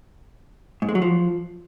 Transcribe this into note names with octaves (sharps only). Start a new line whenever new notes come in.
G#2
G#3
F#3
F3